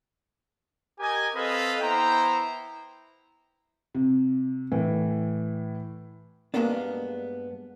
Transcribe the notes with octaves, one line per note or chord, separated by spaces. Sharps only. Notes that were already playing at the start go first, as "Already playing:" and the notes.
G4 A#4 D#5 G#5
C4 A4 B4 D#5 F5
B3 E4 C5 G5 A#5
C3
A2 E3
G2 D3 G#3 A#3 B3 D4